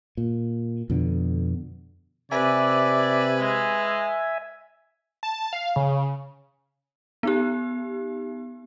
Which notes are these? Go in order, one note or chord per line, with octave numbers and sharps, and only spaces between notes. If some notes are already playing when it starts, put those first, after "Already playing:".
A#2
F2 B2 D3
C3 B4 D5 E5 G#5
G#3
A5
F5
C#3
B3 D#4 G4